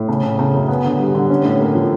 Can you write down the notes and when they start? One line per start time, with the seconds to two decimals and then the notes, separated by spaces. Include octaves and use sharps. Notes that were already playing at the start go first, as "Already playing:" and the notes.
Already playing: A2
0.09 C#3
0.23 C#3
0.39 C#3
0.54 F#2
0.68 B3
0.84 D3
1.00 G3
1.15 D3
1.30 C#4
1.45 A2
1.60 A#3
1.75 F3